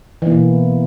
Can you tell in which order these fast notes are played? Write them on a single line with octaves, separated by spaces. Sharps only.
E3 A#3 B2